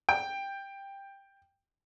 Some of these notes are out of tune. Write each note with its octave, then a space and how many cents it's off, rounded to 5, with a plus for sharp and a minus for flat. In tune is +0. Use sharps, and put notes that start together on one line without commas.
G5 +10